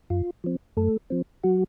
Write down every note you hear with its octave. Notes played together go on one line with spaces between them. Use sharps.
F#2 F4
F3 C4
F#2 A3 A4
F3 C4
F#3 F#4